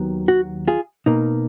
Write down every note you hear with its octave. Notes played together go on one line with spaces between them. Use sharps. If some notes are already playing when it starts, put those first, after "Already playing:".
Already playing: D#2 D#3 F#3 B3
F#4
F4 G#4
B2 A#3 D#4